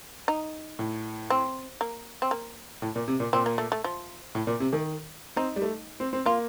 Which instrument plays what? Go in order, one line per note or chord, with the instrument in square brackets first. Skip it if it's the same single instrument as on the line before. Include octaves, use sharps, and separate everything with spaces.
[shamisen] D#4
[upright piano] A2
[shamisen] C4
A#3
C4
A#3
[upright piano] A2
A#2
C3
A#2
[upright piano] A#2 [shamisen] C4
[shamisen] A#3
A3
A3
F3
[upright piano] A2
A#2
C3
D#3
[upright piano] C4 [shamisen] D#4
[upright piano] G3
A3
C4
C4
[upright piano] A#3 [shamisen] F4